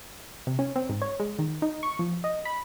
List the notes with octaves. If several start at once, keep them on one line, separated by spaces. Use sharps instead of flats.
C3
C#4
C4
G#2
C#5
G#3
D#3
D#4
C#6
F3
D#5
B5